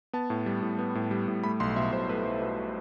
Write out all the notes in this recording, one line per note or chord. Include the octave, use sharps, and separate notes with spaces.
B3 A5
A2
G3
A2
B3
A2
G3
A2
A3 B5
B1 C6
B2 E5
B1 C5
A3 B4
B1
B2